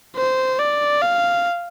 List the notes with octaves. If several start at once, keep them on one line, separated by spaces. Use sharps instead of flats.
C5
D5
F5